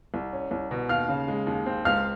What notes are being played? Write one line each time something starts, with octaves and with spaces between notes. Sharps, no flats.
C2
C#4
C2
B2
D#2 F5 F6
C#3
G#3
D#2
C4
C#2 F5 F6